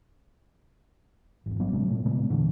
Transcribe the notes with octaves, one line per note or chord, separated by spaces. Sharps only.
G#1 E2
G2 F#3 B3
C3 F#3 G#3 C#4
A#2 A3
A#2 C#3 G#3 B3
E2 A#2 D3 E3